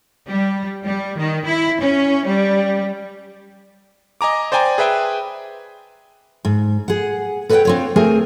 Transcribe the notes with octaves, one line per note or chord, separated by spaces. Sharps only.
G3
G3
D#3
E4
C#4
G3
D#5 G#5 A#5 D6
C5 D5 G5 G#5 A#5
G#4 B4 E5 G5 G#5
G#2
G#4 F#5
A4 B4 C#5 D5 F#5 G5
C4 F4 C#5
A3 C4 G#4 A#4 G#5